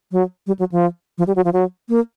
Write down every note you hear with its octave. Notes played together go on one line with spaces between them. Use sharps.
F#3
G3
F#3
F3
F3
G3
F#3
F3
F#3
A#3